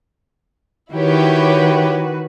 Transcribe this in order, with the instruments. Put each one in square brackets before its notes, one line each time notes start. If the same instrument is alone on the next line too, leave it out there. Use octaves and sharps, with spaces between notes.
[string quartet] D#3 F#4 B4 [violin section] E4 G4 C#5